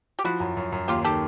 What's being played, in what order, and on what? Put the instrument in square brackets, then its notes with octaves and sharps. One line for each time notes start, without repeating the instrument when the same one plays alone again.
[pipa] G4
[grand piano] F3 [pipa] E4 F#4
[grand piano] F#2
F#2
F#2
[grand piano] D#2 [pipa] F4 G4
[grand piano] D#3 [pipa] G4 A4